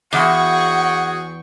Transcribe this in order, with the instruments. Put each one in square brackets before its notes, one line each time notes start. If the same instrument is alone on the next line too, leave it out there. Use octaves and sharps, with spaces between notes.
[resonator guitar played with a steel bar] E2 [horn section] F#4 G#4 [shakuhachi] F#5 [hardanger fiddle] G5 C#6